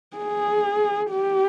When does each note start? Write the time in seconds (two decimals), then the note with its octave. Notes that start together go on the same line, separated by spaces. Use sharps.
0.17 G#4
1.11 G4